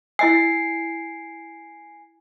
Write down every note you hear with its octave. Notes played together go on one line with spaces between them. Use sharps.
E4 D#5 G#5 E6 C7